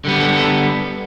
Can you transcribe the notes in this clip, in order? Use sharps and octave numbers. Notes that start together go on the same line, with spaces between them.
D3 G3 B3
A4
A4